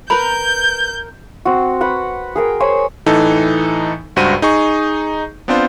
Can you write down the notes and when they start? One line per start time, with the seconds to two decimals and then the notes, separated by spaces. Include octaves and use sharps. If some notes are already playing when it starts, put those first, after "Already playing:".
0.10 A#4 B4 B5 G6
1.45 C4 F#4
1.81 B4 F#5 B5
2.35 G#4 A#4 G5
2.60 C5 C#5 G#5 B5
3.06 A2 E3 D#4 A4
4.16 C#2 G2 F#4 C5 D#7
4.42 D#4 G#4 C#6
5.48 B3 C4 D4 F4 C5